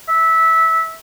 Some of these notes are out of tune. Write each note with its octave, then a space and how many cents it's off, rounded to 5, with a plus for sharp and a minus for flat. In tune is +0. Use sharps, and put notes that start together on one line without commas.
E5 -15